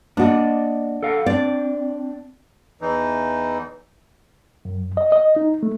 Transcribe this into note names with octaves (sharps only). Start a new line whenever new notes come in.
A#3 D4 F#4 D5 D#5
A4 F5 F#5
C4 D4 D5
E2 E3 D#4
F#2
D#5
D#5
D#4
A3